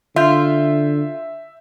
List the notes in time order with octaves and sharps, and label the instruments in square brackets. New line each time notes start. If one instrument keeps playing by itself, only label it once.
[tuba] D3 [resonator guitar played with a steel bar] F4 [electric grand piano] E5 G6